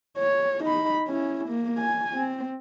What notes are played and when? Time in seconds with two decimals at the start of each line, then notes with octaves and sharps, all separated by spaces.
0.18 C#5
0.64 D#4 B5
1.08 C#4 E4
1.49 A#3
1.78 G#5
2.14 C4